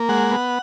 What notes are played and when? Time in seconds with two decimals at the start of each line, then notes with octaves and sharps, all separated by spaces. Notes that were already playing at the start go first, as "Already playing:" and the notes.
Already playing: A#3
0.09 G#3 F#5
0.31 B3